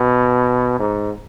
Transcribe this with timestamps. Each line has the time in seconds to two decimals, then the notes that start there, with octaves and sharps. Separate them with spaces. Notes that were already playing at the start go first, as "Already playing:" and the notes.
Already playing: B2
0.80 G#2